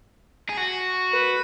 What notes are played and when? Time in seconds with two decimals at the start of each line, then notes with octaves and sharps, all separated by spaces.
0.49 G#4
0.57 F#4
1.13 B4